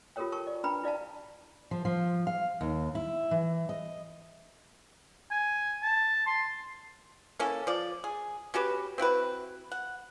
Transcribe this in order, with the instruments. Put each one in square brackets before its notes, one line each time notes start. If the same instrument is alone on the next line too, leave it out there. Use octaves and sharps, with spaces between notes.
[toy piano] F4 G4 A4 A#4 C#5 G5
A#4 G5 A5 C#6
D5
D4 B4 G5 A#5 B5
E4 D5 F5 A5
[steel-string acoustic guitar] F3
F3
F5
D#2
E4
E3
D#5
[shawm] G#5
A5
C6
[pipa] A#3 C#4 E4 A4
F3 D5
G#4
C#4 F#4 G4 B4
C4 E4 F#4 B4
F#5